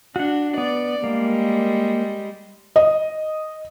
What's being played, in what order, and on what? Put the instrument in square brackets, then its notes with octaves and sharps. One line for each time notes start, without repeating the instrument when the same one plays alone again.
[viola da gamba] D4 [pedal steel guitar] F#4 F#5
[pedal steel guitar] B3 [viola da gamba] D5
[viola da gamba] G3 G#3 [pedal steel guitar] A#3
[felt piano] D#5